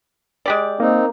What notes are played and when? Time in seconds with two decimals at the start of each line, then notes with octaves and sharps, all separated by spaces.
0.46 G#3 G4 D5
0.80 A#3 C4 D#4